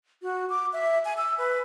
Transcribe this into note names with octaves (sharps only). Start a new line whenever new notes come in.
F#4
D6
E5
G#5
E6
B4